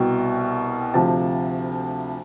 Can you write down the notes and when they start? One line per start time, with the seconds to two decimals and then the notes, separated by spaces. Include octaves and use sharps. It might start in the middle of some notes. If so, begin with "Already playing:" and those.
Already playing: C2 B2 G5
0.94 D2 C3 F3 A5